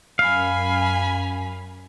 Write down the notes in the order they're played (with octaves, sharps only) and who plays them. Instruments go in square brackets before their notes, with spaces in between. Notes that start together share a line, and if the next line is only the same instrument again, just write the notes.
[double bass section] F#2 [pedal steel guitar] F5 [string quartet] G#5 B5